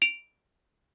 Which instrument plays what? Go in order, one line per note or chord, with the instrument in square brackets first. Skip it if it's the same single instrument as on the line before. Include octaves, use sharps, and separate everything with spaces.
[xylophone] D7 F7